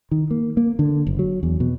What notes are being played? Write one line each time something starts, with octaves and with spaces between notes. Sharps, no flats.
D#3
A#3
A#3
D3
F#1
F#3
E2
B2